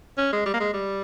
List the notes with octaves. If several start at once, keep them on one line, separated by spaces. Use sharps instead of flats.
C#4
G#3
G3
A#3
G#3
G3